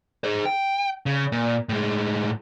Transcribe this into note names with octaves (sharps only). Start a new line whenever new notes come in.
G#4 C5
G5
C#3
A#2
A2 G#3